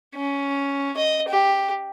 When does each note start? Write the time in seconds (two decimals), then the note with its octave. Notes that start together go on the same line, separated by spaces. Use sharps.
0.16 C#4
0.97 D#5
1.29 G4